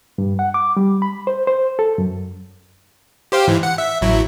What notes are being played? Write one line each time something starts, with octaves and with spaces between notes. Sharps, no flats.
G2
F#5
D6
G3
B5
C5
C5
A4
F#2
G4 C5 F5
G#2 E3
F#5
E5
A1 F#3 E4